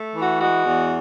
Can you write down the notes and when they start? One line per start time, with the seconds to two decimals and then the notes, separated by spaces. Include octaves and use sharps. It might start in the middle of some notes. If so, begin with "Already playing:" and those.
Already playing: A3
0.14 E3
0.20 F#4
0.39 G#3 F#4
0.64 E2